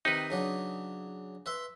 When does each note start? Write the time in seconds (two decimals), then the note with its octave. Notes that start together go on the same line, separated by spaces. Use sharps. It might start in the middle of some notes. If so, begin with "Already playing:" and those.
0.05 C3 D#3 D#4 B4
0.30 C#3 F#3 D4
1.46 B4 E5 C6